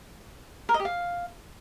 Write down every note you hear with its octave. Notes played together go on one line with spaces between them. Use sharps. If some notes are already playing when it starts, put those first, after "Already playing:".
A#4
D#5
G4
F5